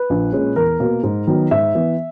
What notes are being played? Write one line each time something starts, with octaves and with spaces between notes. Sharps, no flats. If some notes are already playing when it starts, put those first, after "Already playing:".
Already playing: B4
A#1
A#2 G#3 C#4
E2 A#4
B2 A#3
G#2
D#3 F#3 B3
G#2 E5
E3 B3